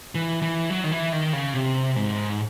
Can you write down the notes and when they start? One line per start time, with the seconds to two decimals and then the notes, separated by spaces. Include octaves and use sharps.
0.15 E3
0.42 E3
0.70 F#3
0.84 D#3
0.92 E3
1.12 D#3
1.33 C#3
1.54 C3
1.96 G#2